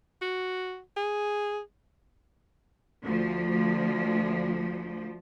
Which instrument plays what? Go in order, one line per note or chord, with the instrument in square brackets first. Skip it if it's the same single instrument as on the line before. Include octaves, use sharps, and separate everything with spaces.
[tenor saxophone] F#4
G#4
[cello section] D2 F3